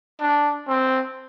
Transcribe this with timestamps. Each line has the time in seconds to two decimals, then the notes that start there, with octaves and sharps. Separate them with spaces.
0.20 D4
0.68 C4